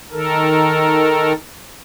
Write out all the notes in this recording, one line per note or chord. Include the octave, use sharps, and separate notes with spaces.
D#3 A4 A#4